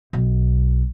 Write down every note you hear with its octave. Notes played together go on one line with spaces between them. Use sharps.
B1